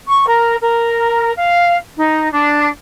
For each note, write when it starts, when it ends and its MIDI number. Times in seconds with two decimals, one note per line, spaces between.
0.07 0.26 85
0.27 0.55 70
0.61 1.32 70
1.37 1.76 77
1.97 2.28 63
2.33 2.67 62